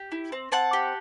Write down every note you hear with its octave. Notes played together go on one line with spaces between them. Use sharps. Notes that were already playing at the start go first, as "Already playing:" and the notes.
Already playing: G4
E4
C4
C4 F#5 A5
G4